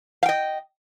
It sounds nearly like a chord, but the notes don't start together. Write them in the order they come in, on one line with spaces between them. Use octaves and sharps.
F5 G5 D#5